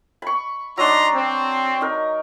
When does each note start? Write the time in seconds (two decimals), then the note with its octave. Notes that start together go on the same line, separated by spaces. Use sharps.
0.22 B5 C#6
0.78 F#3 D4 D#4 A#5 C6
1.15 C4
1.81 D#4 A#4